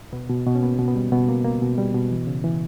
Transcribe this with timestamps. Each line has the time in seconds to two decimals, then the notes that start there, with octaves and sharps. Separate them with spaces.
0.13 B2 B3
0.29 B2
0.46 B2
0.55 C#4
0.62 A#3 B3
0.79 B2
0.88 B3
0.96 G3
1.12 B2 B3
1.29 A#3
1.45 A#3
1.62 B2
1.78 G3
1.94 B2
2.11 E3
2.27 C#3
2.44 E3